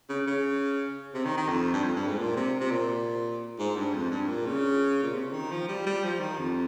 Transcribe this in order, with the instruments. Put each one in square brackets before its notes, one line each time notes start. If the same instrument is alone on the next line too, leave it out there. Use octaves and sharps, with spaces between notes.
[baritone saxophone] C#3
C#3
C3
D#3
D#3
F2
G2
F2
G2
G#2
A#2
C3
C3
A#2
G#2
G2
F2
G2
A#2
C#3
A#2
C3
C#3
D#3
F3
G3
G3
F3
D#3
F2